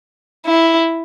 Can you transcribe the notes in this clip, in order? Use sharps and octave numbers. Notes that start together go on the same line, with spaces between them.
E4